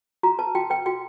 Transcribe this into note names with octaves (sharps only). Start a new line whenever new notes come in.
F#4 A#5
B4 A5
F#4 G5
B4 G5
F#4 G5